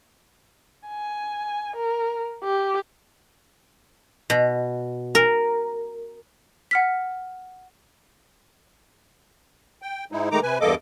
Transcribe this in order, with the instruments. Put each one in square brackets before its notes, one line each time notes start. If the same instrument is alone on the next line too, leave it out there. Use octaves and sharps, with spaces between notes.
[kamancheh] G#5
A#4
G4
[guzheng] B2
A#4
[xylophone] F#5 F6 B6
[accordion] G5
G#2 G#3 D#4 E4
D#3 G#3 A3 D#4 A#5 D6
C3 B4 G#5
E2 G2 A#3 A4 D#5 D6